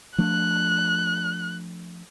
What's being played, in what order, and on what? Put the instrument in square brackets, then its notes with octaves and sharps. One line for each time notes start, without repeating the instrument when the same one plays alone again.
[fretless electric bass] F3 A3 D4 [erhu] F#6